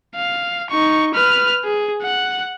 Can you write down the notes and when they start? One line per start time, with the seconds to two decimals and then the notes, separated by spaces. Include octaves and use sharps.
0.15 F5
0.70 D#4 C#6
1.14 B4 F6
1.65 G#4
2.03 F#5